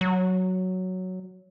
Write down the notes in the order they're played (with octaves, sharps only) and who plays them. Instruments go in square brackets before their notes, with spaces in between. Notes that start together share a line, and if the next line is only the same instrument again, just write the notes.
[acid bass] F#3